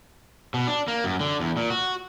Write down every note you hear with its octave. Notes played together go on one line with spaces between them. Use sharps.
B2
D4
A#3
F#2
D3
E2
A#2
F#4